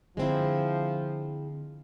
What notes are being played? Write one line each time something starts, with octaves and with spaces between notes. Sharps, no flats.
D3 F3 G#3 C4 E4